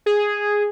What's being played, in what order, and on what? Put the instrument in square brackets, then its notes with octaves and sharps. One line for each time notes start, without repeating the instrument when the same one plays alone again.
[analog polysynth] G#4